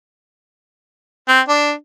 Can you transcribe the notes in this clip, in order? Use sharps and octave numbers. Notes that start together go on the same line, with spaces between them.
C4
D4